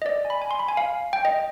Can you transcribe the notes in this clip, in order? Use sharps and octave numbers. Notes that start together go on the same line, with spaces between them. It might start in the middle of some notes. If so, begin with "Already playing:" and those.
D#5
D5
G#5
B5
G#5
C6
B5
G#5
F5
G5
D#5